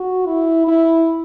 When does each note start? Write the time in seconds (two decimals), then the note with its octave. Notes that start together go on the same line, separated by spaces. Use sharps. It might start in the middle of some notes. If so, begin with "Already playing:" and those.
Already playing: F#4
0.26 E4
0.68 E4